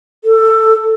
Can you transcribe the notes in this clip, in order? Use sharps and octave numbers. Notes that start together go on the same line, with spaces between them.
A4